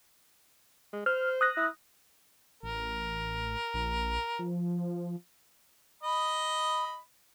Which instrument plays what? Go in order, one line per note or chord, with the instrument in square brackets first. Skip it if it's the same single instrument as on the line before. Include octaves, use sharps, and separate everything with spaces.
[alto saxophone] G#3
[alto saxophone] C5 [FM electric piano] F6
[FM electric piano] D#6 F#6 A#6
[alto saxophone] E4
[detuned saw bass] A1 [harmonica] A#4
[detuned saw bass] A#1
F3
[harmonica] D#5 B5